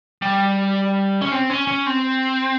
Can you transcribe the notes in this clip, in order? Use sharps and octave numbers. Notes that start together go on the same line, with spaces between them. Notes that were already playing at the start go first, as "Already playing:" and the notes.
G3
C#4
C4
C#4
C#4
C4